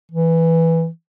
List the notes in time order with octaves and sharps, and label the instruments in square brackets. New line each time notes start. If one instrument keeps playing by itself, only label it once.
[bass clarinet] E3